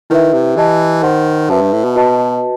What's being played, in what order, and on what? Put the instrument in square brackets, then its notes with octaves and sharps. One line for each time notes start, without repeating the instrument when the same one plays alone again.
[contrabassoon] D#3 [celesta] E4 B4 E5
[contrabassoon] C3
[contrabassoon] E3 [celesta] G4 D#5 A5
[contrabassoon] D#3 [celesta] C5 F#5 C6
[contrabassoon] F#2 [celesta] B4 E5 A5
[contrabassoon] G2
A2
B2
[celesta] F#4 B4 D#5 A5